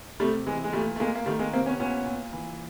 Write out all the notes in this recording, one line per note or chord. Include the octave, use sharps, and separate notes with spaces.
C3 G3 A3
E3 G#3
G#3
A#2 G3 A3
A3
A#2 G#3 A#3
A#3
D#3 G3 A3
G#3 A#3
C3 A#3 C4
B3 C#4
A#2 B3 C#4
A#2
E3